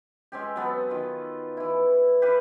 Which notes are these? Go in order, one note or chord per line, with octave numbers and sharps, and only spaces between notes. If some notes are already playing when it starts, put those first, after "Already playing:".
G#3 C4 C#4 G4
F#3 B3 A4
D#3 F4
E3 E4
G4 B4 F5